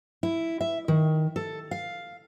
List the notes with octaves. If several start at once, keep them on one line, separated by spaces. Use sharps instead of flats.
E4
E5
D#3
A4
F5